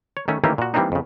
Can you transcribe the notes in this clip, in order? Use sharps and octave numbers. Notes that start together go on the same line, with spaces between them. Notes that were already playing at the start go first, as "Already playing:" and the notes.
C#5
D#3 A3 C#4
D#3 E3 A3 A#3 C#4 G4
A#2 F#4
E3 G3 A#3 C4 D4 D#4
F2 C#3